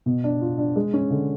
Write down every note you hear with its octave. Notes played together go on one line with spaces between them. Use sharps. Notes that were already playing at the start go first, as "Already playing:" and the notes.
B2
D4
F4
D4
G#3
C#4
D3